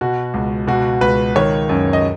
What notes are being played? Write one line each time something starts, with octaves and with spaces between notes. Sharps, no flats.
B2 F#4
C#2
B2 F#4
C#2 B4
D#3 C#5
F#2
D#5